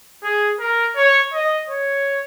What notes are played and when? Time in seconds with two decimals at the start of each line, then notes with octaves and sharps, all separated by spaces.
0.23 G#4
0.60 A#4
0.96 C#5
1.33 D#5
1.69 C#5